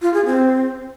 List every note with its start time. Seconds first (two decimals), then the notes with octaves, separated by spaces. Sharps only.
0.02 F4
0.14 G#4
0.26 C4